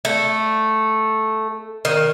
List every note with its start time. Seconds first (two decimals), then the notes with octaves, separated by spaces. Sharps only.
0.05 A3
1.85 D#3